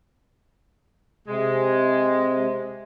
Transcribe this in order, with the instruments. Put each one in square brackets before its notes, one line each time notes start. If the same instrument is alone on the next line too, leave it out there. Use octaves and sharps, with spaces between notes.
[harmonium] C3 [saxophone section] G#3